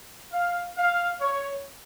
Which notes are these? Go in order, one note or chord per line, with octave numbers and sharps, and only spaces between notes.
F5
F5
C#5